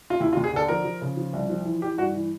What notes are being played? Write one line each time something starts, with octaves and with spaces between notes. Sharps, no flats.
F4
D#2 E4
F4
D#2
G#4
D3 A4
F3 A#4
F3
C#3
F3
C2
F3
E3
E3 G4
G2 F#4
E3